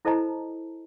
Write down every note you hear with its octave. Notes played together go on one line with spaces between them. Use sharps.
E4 A4 C5 D#5 A5 A#5